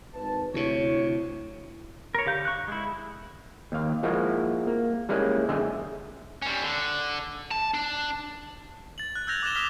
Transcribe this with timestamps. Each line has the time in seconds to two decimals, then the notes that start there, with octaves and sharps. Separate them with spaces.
0.15 G#1 B4 A5
0.54 D2 C3 E4 C#5
2.15 A#4 C#5
2.26 D3 G4 F5 G6
2.45 C#6 F#6
2.68 G#3 E4
3.72 D#2 F5
4.03 F3 G#3 A#3 E4 F#4
4.67 A#3
5.09 G3 G#3 A#3 C#4 E4 G#4
5.48 F#2 D3 G#4 D#5 E5 G5
6.42 G3 C#4
6.63 D3
7.51 A5
7.74 D4
8.98 A6 F#7
9.16 F#6
9.27 E6 F6 G6 G#6 A#6 F7
9.43 D6 F#6 G#6 A6 E7 G7
9.54 D#6 F6 B6 E7 F7 G7